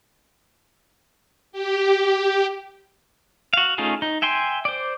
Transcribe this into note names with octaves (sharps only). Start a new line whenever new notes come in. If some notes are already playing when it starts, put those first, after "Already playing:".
G4
F#4 F5
A3 C#4 D#4 F4 G#4
D#4
E5 G5 G#5 C6
C5 D5